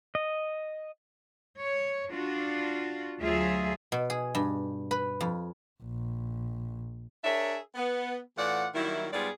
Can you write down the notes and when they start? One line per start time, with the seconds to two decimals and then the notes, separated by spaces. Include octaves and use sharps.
0.15 D#5
1.58 C#5
2.10 D4 F4 F#4
3.21 D2 F#3 A3 F4 G#4 E5
3.92 B2
4.10 G#4
4.35 G2
4.91 B4
5.21 F2
5.82 A#1
7.24 D4 G#4 A#4 C#5 E5
7.75 B3
8.38 A2 E3 F4 D5 F#5
8.75 D#3 F#3 G3 A#3 E4
9.12 G#2 G3 B3 F4 G#4 D5